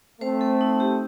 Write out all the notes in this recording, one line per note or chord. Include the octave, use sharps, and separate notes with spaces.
A3 C4 C5
A4
D#4
G4